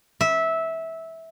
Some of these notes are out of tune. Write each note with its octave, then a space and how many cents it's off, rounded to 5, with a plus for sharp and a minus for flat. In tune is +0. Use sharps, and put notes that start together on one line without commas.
E5 -15